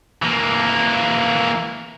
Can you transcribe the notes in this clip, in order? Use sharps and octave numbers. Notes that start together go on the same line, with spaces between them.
E3 A#3